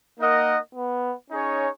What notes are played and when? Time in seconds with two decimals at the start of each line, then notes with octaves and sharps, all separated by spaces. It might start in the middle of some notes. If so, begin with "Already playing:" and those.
0.18 A#3 D#4 A#4 D#5 F#5
0.75 B3
1.30 C#4 D#4 G#4 C#5